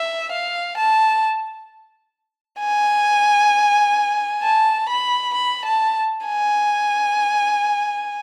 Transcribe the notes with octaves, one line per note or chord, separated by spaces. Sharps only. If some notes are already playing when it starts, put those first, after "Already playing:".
Already playing: E5
F5
A5
G#5
A5
B5
B5
A5
G#5